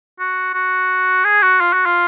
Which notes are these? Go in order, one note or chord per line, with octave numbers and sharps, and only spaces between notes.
F#4
F#4
G#4
F#4
F4
F#4
F4